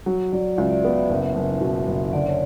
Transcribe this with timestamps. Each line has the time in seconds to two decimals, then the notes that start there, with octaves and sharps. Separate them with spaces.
0.06 F#3
0.32 F#3 D5
0.58 C#2 E5
0.71 D5
0.84 B3 D5
0.97 E5
1.10 F#1
1.35 F#1
1.61 B2
1.88 F#1
2.13 D3 D5
2.26 C#5